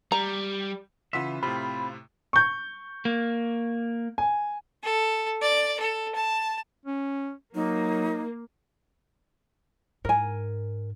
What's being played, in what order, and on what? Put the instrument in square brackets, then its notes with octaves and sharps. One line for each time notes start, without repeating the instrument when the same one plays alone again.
[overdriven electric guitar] G3 [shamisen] A#5
[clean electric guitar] C#3 E3 E5 [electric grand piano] F4 F#5 C6
[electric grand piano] A2 C3 [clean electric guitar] C4 F4 [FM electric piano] B5
[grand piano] C#6 G6
[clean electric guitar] A#3
[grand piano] G#5
[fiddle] A4
D5
A4
A5
[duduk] C#4
[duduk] F#3 [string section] A#3 [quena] D#4
[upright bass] G#2 [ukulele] A#4 G#5